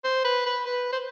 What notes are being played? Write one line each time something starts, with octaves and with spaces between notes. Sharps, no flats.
C5
B4
B4
B4
C5